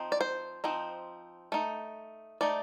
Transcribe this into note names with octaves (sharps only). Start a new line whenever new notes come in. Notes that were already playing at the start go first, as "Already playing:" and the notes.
Already playing: F3 C4 D#4
D5
C5
F3 C4 D#4
A3 D#4
A3 D#4 D5